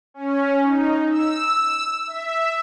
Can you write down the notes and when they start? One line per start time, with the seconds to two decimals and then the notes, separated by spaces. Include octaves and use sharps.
0.14 C#4
0.62 D#4
1.11 E6
2.07 E5